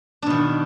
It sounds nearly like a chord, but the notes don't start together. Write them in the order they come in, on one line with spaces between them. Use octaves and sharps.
D4 B2 D#3